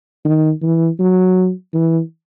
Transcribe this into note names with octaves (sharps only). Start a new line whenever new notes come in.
D#3
E3
F#3
E3